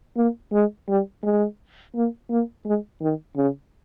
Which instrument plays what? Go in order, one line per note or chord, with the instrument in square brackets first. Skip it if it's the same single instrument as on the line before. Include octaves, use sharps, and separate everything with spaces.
[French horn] A#3
G#3
G3
G#3
A#3
A#3
G#3
D#3
C#3